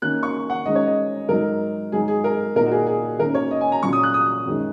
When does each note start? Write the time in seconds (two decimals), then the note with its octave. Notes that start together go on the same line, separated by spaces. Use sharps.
0.02 D#3 A#3 C#4 F#6
0.23 C#6
0.50 F#5
0.66 D#3 G#3 C#4 D#5
0.75 C#5
0.86 D#5
1.29 G#2 F#3 D#4 A#4
1.92 G#2 F#3 D#4 G#4
2.08 G#4
2.24 A#4
2.55 A#2 A#3 D#4 A#4
2.66 F#4
2.72 G#4
2.87 G#4
3.19 D#3 A#3 C#4 A#4
3.35 C#5
3.51 D#5
3.61 G#5
3.72 A#5
3.83 A#2 F#3 C#4 C#6
3.93 D#6
4.03 F#6
4.14 D#6
4.46 F#2 D#3 G#3 C#4